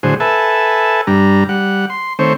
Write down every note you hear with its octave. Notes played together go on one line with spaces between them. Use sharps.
A2 D3 F#3 G#4 C5
A4 B4 E5 G#5 A5
G2 G3 D4 A#5
G3 F#5
C6
D#3 A3 C4 C5 C#5